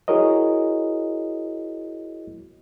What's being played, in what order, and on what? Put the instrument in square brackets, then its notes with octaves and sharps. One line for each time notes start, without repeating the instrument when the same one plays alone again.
[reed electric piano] E4 F#4 G#4 A#4 C#5 D#5